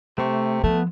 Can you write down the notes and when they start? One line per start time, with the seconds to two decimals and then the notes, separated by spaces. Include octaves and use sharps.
0.18 C3 A3 C#6
0.63 F3 A3 B3